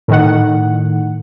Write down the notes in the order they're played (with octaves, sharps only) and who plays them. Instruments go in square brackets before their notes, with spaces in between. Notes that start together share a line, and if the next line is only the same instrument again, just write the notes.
[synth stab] A2 D#3 F#5